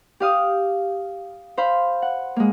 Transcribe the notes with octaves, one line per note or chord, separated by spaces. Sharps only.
G4 F5 D#6
C5 F5 B5
F#5
G#3 A#3